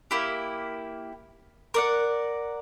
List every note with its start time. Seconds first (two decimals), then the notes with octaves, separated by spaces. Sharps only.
0.11 A#3 E4 G4
1.74 A#4 D5 F#5